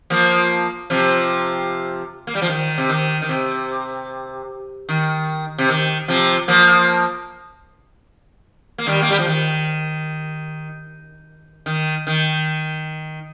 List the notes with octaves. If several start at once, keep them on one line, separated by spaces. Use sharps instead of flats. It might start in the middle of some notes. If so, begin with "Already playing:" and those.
F3 A#3
C3 F3
A#3
G3
F3
D#3
C3
D#3
D#3
C3
D#3
C3
D#3
C3 F3
F3 A#3
A#3
D#3 G3
A#3
G3
F3
D#3
D#3
D#3